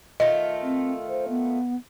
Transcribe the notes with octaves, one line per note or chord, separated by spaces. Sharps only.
D#3 A3 F4 D#5
C4
C5
B3